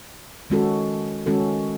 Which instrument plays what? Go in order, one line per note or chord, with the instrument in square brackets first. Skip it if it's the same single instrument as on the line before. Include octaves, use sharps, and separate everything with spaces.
[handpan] D#3 G#3 C#4 F#4 A4
D#3 G#3 C#4 F#4 A4